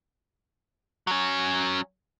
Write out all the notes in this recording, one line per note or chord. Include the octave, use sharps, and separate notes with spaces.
F#3 C#4